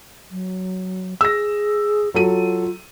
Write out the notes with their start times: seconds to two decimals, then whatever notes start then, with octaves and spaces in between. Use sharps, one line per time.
0.31 F#3
1.21 G#4 E6 A#6
2.14 F#3 F4 A4 D#7